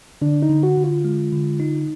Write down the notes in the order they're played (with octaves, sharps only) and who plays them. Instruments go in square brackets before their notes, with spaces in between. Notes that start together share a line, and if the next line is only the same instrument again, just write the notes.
[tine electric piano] D3 [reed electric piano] D4
[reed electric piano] D#4
[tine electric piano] D3
[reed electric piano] F#4
[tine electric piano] D3
[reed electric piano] F4
[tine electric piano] G#3
D3
D#4